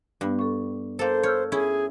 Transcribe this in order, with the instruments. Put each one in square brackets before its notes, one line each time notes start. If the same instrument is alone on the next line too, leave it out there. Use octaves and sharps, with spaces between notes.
[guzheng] G2 [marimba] G3 B3
[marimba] A4 C#6
[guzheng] A#3 A4 [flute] C5
[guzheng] C#5 [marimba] E6 F6 G6
[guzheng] C#4 E4 [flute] G#4